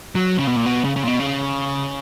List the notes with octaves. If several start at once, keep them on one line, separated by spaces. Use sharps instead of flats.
F#3
C#3
B2
A#2
B2
C#3
C#3
A#2
B2
C#3